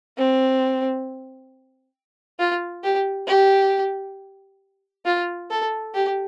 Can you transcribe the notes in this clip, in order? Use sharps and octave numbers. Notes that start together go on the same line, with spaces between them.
C4
F4
G4
G4
F4
A4
G4